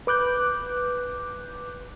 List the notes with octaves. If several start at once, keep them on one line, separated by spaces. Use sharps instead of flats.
B4 D6 F#6 G6